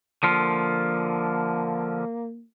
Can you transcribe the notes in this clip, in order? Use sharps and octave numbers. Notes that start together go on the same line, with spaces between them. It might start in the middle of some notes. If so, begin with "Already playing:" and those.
D3 F3 A#3 F4